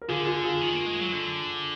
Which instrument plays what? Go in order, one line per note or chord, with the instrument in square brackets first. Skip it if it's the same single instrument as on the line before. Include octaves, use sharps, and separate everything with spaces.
[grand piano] A#4
[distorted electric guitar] D3 [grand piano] F4 G#4
[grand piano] F4 G#4
F4 G#4
[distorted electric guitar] D#3
A#3
G#3
F#3
D3